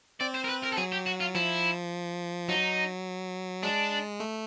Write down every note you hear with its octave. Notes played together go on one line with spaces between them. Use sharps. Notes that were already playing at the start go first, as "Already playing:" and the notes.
C4 D5
C5
A#4
B4
A#4
A4
F#3 G#4
G4
F#4
F4
F3 E4
F#3 D#4
G#3 D4
A3